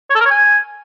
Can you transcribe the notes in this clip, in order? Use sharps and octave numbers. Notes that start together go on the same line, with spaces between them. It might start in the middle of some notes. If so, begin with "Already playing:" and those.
C#5
A4
A#4
C#5
G#5